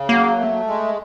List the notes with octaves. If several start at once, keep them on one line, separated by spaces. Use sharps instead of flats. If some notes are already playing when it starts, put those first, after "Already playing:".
Already playing: C#3
F#3 A#3
A3
G#3